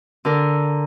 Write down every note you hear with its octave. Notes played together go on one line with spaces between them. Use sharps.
D3 A#4